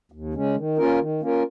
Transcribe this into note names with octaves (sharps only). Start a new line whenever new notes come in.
D#2
C#3 G#3 C#4
D#3
A#3 C#4 F4 A#4
D#3
A#3 C#4 F4 A#4